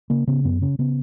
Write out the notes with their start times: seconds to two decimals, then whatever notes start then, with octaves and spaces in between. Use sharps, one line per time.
0.10 C#3 A#3
0.27 C#3 B3
0.45 F#2 B3
0.62 C#3 C#4
0.79 C#3 B3